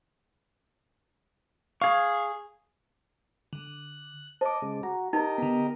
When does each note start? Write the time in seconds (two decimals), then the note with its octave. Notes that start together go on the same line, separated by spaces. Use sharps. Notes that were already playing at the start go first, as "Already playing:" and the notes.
1.81 G#4 F5 C#6
3.53 D3 F#6
4.41 C5 D#5 A5 D6
4.62 C#3 G#3
4.83 F#4 A#5
5.13 D#4 G4 A#4 D#5
5.38 D3 B3